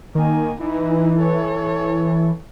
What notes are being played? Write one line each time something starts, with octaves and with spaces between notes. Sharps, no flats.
D#3 A#3 G#5
E3 D#4 E4
A4 C#5